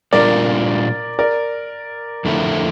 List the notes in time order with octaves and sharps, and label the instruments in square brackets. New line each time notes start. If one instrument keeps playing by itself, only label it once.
[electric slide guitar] A#2 G3 D4 F4 [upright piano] A#4 D5
[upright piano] A#4 D5
[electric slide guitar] F2 D3 A3 E4